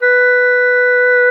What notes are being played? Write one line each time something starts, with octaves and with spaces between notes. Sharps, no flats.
B4